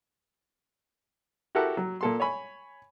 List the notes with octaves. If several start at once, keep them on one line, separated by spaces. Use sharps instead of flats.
E4 F#4 G4 A4 A#4 F#5
F#3
A#2 A4 C6
C#5 G#5 B5